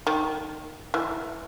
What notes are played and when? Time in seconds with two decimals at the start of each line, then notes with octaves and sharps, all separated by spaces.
0.07 D#3
0.94 E3